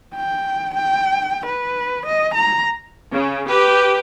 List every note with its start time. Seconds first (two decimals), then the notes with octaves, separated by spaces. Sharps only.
0.15 G5
0.74 G5
1.47 B4
2.06 D#5
2.35 A#5
3.12 C#3
3.48 G4 B4